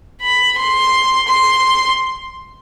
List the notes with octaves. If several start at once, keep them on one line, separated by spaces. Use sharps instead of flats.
B5
C6
C6